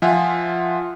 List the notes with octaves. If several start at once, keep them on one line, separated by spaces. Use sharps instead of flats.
F3 F4 E5 F#5 G#5